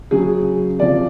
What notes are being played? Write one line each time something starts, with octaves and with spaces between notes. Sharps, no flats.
C#3 F#3 G#4
C3 F3 D5